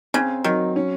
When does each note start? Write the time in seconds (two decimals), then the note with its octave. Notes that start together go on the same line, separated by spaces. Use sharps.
0.14 C#3 C4
0.44 D#3 F#3
0.76 C#4